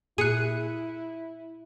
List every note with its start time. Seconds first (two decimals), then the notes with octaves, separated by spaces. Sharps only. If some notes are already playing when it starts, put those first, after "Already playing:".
0.18 A#2 E4 G#4 F#6 C#7 D#7